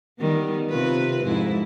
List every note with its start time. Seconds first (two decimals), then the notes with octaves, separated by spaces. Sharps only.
0.19 D#3 G3 B3
0.70 C3 F4 B4
1.24 F2 G#2 E4